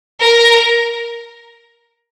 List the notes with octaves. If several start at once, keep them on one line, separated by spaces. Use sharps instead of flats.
A#4